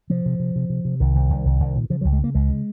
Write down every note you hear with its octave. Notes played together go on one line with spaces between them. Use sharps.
C3 F3
C3
C3
C3
C3
C3
C2 D#3
C2
C2
C2
C2
A#2
C#3 F3
C#2 F#3
G#3
C#3 A#3
C#2 G#3
C#3